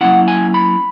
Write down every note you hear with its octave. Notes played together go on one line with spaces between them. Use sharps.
F#3 A#3 C#4 E4 F#5
G#5
B5